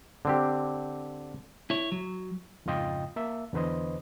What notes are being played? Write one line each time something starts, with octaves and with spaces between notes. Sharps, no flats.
D3 C4 G4
E4 C#5
F#3
F2 G#2 C#3 F4 D#5 G5
A#3 E5
E2 D3 B4 C5 D#5